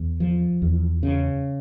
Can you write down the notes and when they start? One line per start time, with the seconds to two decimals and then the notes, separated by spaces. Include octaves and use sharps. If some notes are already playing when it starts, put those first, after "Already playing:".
Already playing: E2
0.20 F3
0.62 E2
1.03 C#3